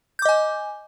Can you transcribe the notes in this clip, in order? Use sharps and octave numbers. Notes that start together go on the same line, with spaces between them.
D#5 G#5 D6 G6